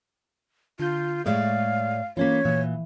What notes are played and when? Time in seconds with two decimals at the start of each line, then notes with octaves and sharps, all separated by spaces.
0.80 D3 F4 G6
1.26 A2 G#3 C#5 D5 F5
2.17 E3 A#3 C#4 F4 C#5 B6
2.45 A#2 E3